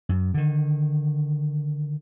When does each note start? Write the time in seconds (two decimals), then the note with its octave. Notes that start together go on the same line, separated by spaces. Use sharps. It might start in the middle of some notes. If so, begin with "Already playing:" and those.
0.09 F#2
0.34 D3 D#3